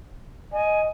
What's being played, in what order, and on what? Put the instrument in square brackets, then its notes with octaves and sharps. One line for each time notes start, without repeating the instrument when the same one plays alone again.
[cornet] D#5 [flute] G#5